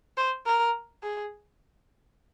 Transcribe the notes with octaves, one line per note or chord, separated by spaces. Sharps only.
C5
A#4
G#4